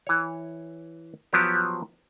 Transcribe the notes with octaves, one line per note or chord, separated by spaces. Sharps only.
E3 C#5
F3 F#3 B3 G4